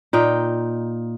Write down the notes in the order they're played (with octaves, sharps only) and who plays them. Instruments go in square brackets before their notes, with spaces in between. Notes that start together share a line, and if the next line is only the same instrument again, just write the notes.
[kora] A#2 D#4 G5